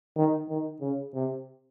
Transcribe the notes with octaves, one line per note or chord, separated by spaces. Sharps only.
D#3
D#3
C#3
C3